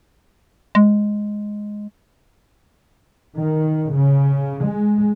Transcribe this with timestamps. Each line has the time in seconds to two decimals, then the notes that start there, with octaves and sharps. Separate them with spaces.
0.75 G#3
3.38 D#3
3.92 C#3
4.63 G#3